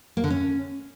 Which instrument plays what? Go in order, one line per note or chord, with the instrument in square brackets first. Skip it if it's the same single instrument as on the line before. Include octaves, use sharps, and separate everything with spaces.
[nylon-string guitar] A#3
D3
C#4